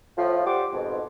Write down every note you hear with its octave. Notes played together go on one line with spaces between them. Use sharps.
A2 F3
G3 G4 C5 F#5 C6 D6
F2 G#2 B2